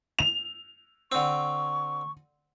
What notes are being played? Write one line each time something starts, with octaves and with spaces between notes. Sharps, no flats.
F7
D3 C4 C#6